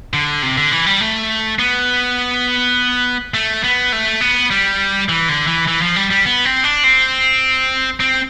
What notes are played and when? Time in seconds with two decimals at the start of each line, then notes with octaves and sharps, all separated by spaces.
0.14 D3
0.42 C3
0.57 D3
0.72 E3
0.86 G3
1.01 A3
1.59 B3
3.34 A3
3.64 B3
3.92 A3
4.21 B3
4.51 G3
5.09 E3
5.29 D3
5.47 E3
5.68 E3
5.82 F3
5.96 G3
6.11 G3
6.26 B3
6.45 C4
6.64 D4
6.84 C4
8.00 C4